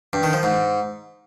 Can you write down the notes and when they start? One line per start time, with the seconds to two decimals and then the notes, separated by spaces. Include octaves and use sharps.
0.13 G2
0.23 D#3
0.33 F3
0.43 G#2